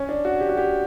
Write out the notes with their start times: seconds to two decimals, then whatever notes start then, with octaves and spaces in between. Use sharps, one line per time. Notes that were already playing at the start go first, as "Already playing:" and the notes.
Already playing: C#4
0.09 D4
0.25 F#4
0.40 G4
0.49 F#4
0.57 G4